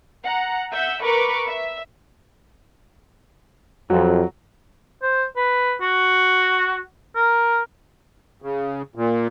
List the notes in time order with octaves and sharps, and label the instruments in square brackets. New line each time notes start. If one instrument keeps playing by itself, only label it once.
[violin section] F#5 A#5
E5 F#5 E6 G6
A#4 B4 B5 C#6 D6
E5
[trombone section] F2 [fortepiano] F#3
[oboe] C5
B4
F#4
A#4
[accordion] C#3
A#2